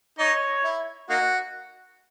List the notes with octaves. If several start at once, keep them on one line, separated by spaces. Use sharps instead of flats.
D#4 C#5
E4
A#3 D#4 F#4